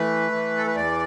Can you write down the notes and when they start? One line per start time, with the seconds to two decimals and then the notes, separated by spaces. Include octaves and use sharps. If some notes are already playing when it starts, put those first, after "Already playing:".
Already playing: E3 A3 B4
0.32 E3
0.57 A4
0.67 B4
0.75 E2 D5